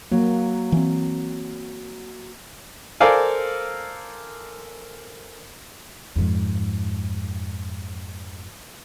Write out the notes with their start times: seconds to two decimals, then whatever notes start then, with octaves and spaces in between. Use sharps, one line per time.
0.12 F#3 A#3
0.72 E3 C4
3.00 A4 A#4 C5 D5 F5 G#5
6.16 F2 G#2